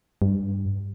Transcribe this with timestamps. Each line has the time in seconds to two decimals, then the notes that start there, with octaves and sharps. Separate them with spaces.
0.22 G2